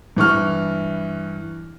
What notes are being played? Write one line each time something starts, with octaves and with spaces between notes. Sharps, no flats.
G2 E3 C#6 F6